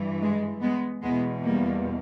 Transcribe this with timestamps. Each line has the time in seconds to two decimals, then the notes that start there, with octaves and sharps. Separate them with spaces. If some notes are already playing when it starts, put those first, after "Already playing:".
Already playing: G2 E3
0.21 G#3
0.61 G#3 B3
1.02 E2 B2 G#3 B3
1.43 G3 A#3